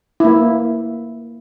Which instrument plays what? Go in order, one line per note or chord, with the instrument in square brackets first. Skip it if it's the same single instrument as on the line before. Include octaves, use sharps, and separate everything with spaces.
[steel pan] A#3 E4